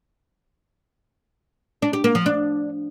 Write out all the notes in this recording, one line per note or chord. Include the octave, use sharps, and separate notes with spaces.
D4
G4
A#3
F3
D4